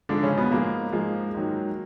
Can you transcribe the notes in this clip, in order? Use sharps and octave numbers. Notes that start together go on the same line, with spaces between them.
G#2 D3 F3 G#3 D4
C#3 C#4
B2 B3
G#2 F3 G#3 A#3
G#2 F3 G#3
G#2 D#3 F#3